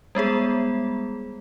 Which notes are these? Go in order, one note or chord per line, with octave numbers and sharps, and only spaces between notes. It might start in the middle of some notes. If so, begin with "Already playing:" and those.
G3 G#3 B3 G#4